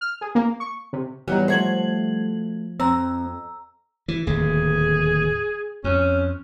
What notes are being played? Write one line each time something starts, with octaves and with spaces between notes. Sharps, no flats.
F6
G#4
A#3
C#6
C3
E3 F#3 G3 B3 D#4
F3 A3 F#4 C5 G#6 F#7
F2 C4 A#5 E6
E3
D1 D#2 C3 G#4
F2 C#4